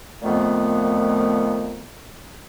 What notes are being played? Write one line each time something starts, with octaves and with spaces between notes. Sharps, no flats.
F2 A#2 D#3 A3 B3